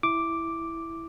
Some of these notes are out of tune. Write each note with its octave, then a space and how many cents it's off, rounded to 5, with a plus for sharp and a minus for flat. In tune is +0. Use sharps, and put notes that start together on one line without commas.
E4 +0 D6 +0